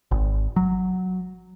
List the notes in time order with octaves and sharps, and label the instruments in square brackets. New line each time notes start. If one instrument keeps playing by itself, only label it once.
[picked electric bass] G#1
F#3